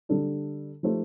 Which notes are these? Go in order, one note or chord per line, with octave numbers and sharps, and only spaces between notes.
D3 G3 D4 A4
F3 A3 D#4 G4 C5